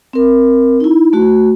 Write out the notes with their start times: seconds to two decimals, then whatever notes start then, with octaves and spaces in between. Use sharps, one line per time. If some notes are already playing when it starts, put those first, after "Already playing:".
0.13 C4 A#4
0.80 D#4 E4
1.13 A3 F#4